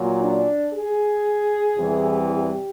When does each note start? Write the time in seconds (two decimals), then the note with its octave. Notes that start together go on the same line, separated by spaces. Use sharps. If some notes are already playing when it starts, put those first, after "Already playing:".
Already playing: A#2 F#3
0.19 D4
0.72 G#4
1.76 E2 C3 E3 G3
2.29 G4